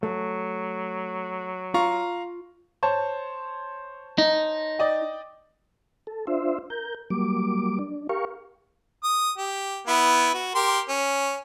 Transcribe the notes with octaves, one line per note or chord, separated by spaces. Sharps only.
F#3 A3
F4 F5 A#5 C#6
C5 C#5 A5
D#4
D5 D#5 G5
A4
D4 F4 C5 E5
A#4 G6
F#3 G3 A#3 D6
D4
G4 A#4 F5 C#6
D#6
G4
B3 E4
F#4
G4 A#4 C6
C#4